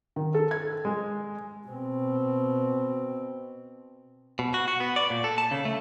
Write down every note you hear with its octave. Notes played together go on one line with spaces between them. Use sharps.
D#3
A4
G#6
G#3
B2 C4
B2
F#4
F#4
B3
D5
A#2
A4
A5
C#3
A3